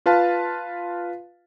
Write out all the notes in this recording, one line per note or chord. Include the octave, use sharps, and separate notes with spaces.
F4 B4 F5 A5